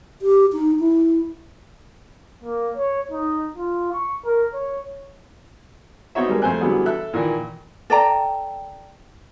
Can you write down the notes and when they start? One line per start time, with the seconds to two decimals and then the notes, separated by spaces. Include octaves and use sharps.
0.22 G4
0.53 D#4
0.80 E4
2.44 A#3
2.77 C#5
3.12 D#4
3.56 F4
3.92 C#6
4.25 A#4
4.54 C#5
6.15 B3 C4 D#4 F#4 C#5 E5
6.28 G3 G#3 A#3
6.42 F2 A3 C5 G#5 F#6
6.61 D3 E3 F#3 G3 B3 G#4
6.86 A4 E5 F#6
7.14 A#2 D#3 E3
7.90 A4 D5 G5 A#5